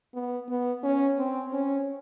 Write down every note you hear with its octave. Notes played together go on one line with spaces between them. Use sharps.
B3
B3
C#4
C4
C#4